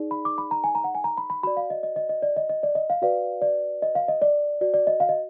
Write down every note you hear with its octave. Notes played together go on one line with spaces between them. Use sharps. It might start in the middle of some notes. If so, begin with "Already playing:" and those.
Already playing: D#4 G#4 D5
B5
D6
B5
A#5
G#5
A#5
F#5
G#5
A#5
B5
B5
F#4 D5 B5
F5
D#5
D#5
D#5
D#5
D5
D#5
D#5
D5
D#5
F5
F#4 B4 D5 F5
D5
D#5
F5
D#5
D5
F#4 D5
D5
D#5
F5
D#5